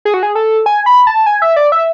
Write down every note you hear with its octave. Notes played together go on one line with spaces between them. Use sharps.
G#4
F#4
G#4
A4
G#5
B5
A5
G#5
E5
D5
E5